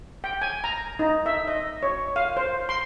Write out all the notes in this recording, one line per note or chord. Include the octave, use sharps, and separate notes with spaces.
G5
G#5
A#5
D#4
E5
D#5
C#5
F5
C5
C6